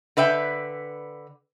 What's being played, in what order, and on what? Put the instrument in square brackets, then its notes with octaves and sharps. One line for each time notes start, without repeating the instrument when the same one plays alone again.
[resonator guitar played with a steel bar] D3 B4 E5 G5